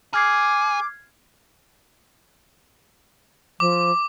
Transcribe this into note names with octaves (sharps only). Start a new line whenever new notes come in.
G#4 D6 F6 G#6 C7
F3 D6